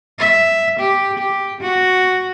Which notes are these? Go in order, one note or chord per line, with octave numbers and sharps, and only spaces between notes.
E5
G4
G4
F#4